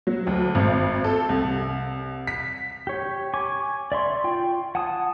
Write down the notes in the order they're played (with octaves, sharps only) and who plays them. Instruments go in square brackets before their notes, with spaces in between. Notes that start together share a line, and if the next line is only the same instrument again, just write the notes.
[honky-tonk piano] F#3
D2
G#1
A4
C2
B6
[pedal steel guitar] G4 C#5
G#5 C#6 D6
D5 E5 C6 C#6
F4 G5
F#5 G#5 A5 D#6